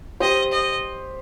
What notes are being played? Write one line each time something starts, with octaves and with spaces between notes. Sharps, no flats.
G4 C5 D#5
D#5